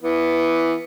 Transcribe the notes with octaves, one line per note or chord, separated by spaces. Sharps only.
E3 B3